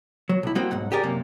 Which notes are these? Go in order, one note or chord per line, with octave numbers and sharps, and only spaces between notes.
F#3
B1 E4
G3 A#3 C4 F#4 D#5
B1 G#2 F#5
G4 G#4 A#4 D5
F#2 C3 A#3